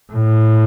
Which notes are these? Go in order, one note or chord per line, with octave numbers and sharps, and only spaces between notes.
A2